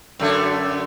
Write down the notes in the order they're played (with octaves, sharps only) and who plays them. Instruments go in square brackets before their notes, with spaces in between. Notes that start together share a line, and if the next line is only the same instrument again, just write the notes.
[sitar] F#2 D3 A3